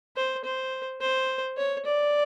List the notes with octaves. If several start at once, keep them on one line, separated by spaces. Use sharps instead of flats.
C5
C5
C5
C#5
D5